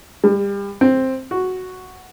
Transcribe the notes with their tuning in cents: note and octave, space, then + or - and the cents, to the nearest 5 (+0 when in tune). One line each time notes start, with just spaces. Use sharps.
G3 +30
C4 +5
F#4 +0